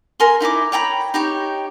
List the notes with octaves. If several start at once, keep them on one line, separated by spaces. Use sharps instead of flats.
A#4 G#5 C6
D#4 E4 A#4 D6
C#5 G5 A#5 B5
D#4 G4 C#5